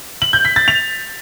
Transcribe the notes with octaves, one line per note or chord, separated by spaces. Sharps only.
F#7
G6
B6
A6
F7